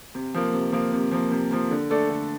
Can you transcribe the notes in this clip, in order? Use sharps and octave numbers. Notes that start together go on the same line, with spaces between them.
C3
F3 A#3
C3
F3 A#3
C3
F3 A#3
C3
F3 A#3
D3
A3 D4 A4 D5
D3